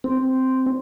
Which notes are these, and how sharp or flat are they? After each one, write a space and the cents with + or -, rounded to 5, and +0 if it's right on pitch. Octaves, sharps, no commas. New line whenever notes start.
C4 -5